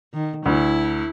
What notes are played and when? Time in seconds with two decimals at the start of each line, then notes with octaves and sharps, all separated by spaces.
0.13 D#3
0.45 D2 E4